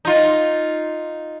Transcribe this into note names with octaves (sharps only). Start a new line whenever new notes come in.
D#4 F4